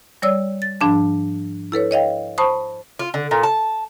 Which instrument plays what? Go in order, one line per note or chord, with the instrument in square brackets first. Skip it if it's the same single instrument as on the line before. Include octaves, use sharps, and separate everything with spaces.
[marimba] G3 C#5 D5 E6
A6
G#2 F3 D4 A5
E4 A4 B4 C#5
C#5 D#5 F5 G5
C5 A5 B5 C#6 D#6
[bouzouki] F4
D3
A#2
A5